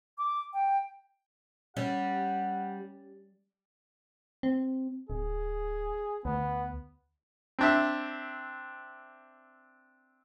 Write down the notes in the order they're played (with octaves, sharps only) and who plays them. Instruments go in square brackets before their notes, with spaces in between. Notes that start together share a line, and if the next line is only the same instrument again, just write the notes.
[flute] D6
G5
[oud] G3 [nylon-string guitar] C#4 [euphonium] G4 [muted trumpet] F#5
[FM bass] C4
[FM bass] D1 [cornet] G#4
[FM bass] D2 [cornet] B3
[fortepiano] C4 D4 E5